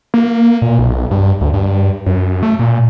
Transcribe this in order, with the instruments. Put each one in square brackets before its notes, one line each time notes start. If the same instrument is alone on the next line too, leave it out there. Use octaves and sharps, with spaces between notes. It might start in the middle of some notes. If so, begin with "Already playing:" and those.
[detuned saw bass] A#3
A#2
B1
G2
D2
G2
F#2
A3
A#2